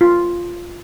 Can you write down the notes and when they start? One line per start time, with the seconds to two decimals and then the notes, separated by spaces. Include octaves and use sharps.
0.01 F4